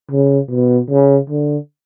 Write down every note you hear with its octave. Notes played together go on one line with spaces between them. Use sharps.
C#3
B2
C#3
D3